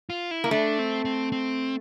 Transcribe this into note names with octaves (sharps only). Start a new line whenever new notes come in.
F4
E4
A#3
A3 D4
C4
C4
C4